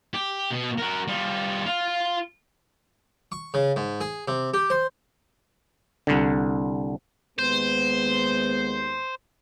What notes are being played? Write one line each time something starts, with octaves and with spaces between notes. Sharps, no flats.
G4
B2
F#4 A#4
G3 F4
F4
C#6
C#3
G#2
G#4
C3
G4
C5
C2 D3
D#2 G#3 B3 C5